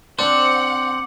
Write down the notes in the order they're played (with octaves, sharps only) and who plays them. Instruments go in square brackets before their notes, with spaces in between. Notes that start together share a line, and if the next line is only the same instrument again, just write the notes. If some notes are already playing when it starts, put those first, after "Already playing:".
[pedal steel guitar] C4 C5 [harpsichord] D4 [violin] F#5 [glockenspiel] D6